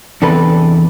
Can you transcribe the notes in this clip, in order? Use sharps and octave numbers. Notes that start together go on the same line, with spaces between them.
E2 C3 D4 A4 B4